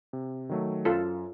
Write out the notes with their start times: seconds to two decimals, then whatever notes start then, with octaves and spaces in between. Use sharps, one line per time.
0.13 C3
0.49 D#3 F#3 A3
0.85 F#2 F4 A4